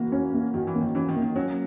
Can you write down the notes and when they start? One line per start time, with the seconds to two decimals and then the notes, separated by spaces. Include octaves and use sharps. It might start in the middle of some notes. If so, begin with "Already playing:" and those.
Already playing: E3 A#3 F#4
0.12 C#4
0.34 A#3
0.54 D#3 F#4
0.67 E3
0.75 A#3
0.81 D#3
0.95 E3 C#4
1.09 D#3
1.16 A#3
1.22 D#3
1.35 F#3 C#4